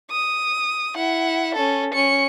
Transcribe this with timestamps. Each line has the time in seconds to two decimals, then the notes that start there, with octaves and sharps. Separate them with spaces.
0.11 D#6
0.96 E4 F#5
1.55 C#4 A4
1.94 C#4 C#7